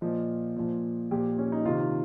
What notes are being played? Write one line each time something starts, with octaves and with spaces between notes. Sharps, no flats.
A#2 F3 D#5
A#2 F3
A#2 F3 G4
C#4
D#4
C3 D#3 F4